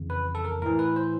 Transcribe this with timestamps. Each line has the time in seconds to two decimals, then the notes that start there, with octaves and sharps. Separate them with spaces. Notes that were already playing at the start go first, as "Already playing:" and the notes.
Already playing: F2 C#3 E3
0.10 B4
0.35 A4
0.45 A#4
0.62 A2 E3 A#4
0.79 B4
0.96 C5